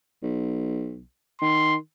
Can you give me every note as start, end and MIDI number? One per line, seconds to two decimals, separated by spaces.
0.23 1.02 35
1.41 1.76 51
1.41 1.76 84